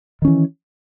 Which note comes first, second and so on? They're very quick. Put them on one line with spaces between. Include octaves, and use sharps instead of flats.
D#3 C#4 E3